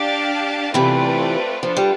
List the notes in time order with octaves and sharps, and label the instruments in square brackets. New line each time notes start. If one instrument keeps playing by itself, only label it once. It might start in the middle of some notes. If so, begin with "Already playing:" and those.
Already playing: [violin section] D4 G4 D5 F5 A5
[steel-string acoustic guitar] C3 E3 [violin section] A3 C4 F4 B4 D5
[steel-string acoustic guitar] F3 [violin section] B3 D4 F4 A4
[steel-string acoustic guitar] G3